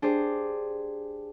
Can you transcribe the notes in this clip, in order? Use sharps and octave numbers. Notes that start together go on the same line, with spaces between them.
D4 G4 G#4 C5